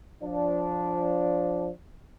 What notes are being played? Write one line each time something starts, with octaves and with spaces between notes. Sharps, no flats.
F3 D4